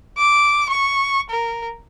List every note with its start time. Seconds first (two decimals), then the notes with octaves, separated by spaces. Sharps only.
0.18 D6
0.70 C#6
1.30 A#4